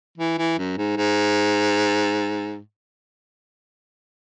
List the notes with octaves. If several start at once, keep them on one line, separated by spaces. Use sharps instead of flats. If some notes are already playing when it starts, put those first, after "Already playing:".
E3
E3
F#2
G#2
G#2